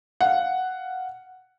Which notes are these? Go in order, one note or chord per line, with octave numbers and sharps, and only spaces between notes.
F5 F#5